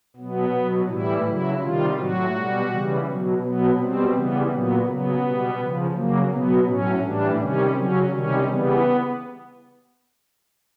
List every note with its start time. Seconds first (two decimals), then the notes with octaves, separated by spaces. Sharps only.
0.16 B2 F#3 B3
0.53 B2 F#3
0.88 A2 E3 G3 E4
1.25 C#3 F#3 E4
1.61 C3 D#3 G3 F4
1.97 A2 F#3 F#4
2.33 B2 G3
2.69 C#3 E3 G3
3.05 B2 F#3
3.41 B2 F#3 B3
3.77 B2 G3 C4
4.13 C#3 E3 G3 B3
4.49 A#2 F#3 B3
4.85 C#3 F#3 B3
5.22 B2 G3
5.58 C#3 F3
5.94 C#3 F#3 A#3
6.30 B2 F#3 B3
6.66 A2 F#3 C#4
7.02 A2 E3 G3 D4
7.38 C3 D#3 G3 C#4
7.74 C#3 F#3 C#4
8.11 C3 D#3 G3 C#4
8.46 C#3 E3 G3 B3